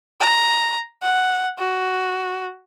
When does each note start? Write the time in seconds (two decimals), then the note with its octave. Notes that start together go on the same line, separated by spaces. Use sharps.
0.21 A#5
1.02 F#5
1.58 F#4